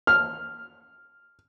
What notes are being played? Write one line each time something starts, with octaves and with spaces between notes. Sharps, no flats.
F6